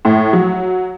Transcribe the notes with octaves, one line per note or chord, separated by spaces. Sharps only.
A2
F#3